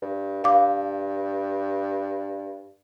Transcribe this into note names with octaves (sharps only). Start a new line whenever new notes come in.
G2
G2 F5 D6